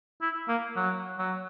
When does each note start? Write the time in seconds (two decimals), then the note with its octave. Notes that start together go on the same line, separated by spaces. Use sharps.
0.22 E4
0.48 A#3
0.76 F#3
1.19 F#3